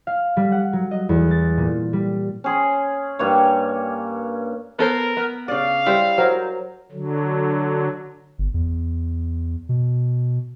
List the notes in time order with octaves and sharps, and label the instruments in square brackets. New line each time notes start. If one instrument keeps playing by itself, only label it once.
[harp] F5
G3
F#5
F#3
D#5
E2
A6
A#2
G3
[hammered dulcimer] C#4 G#4 C6
G2 A#3 C#5
[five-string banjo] B3 A4 C5 [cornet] A#4
[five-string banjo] B3
[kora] C#3 D5 [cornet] F5
[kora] G3 C5 [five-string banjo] E4
[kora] F#3 A#4 [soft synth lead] C5
[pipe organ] D3 F#3
[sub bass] G1
E2
B2